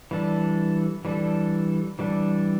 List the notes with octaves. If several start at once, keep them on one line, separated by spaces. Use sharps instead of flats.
E3 G3 D4 A4
E3 G3 D4 A4
E3 G3 D4 A4